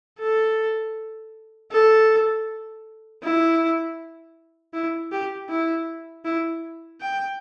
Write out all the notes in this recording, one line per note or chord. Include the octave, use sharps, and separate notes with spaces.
A4
A4
E4
E4
G4
E4
E4
G5